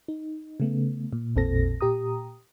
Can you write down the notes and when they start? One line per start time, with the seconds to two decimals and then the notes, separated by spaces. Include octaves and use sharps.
0.08 D#4
0.60 C#3 A3 B3
1.13 A#2
1.35 A1 E2 A#2 C4 A4 A#6
1.81 A#2 G4 A#5 D#6